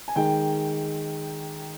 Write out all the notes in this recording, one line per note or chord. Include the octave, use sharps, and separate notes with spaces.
G#5
D#3 G#3 G5